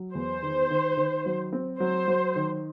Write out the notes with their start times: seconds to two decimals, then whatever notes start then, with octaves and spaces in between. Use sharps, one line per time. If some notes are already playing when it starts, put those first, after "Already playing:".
Already playing: F#3
0.15 E2 C5
0.43 D#3
0.70 D#3
0.97 D#3
1.26 F#3
1.53 C4
1.80 F#3 C5
2.08 F#3
2.36 D#3